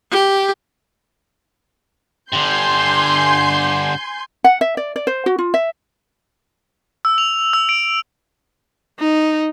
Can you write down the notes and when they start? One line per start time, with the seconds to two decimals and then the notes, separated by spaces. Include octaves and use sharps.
0.11 G4
2.32 G2 D3 G#5 C6 G6
4.44 F#5
4.61 E5
4.77 D5
4.96 D5
5.07 C5
5.26 F#4
5.38 F4
5.54 E5
7.05 E6
7.18 F7
7.53 E6
7.69 D7
8.99 D#4